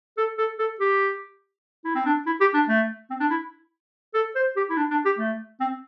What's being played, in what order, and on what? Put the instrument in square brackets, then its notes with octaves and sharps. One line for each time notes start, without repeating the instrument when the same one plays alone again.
[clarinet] A4
A4
A4
G4
E4
C4
D4
E4
G4
D4
A3
C4
D4
E4
A4
C5
G4
E4
D4
D4
G4
A3
C4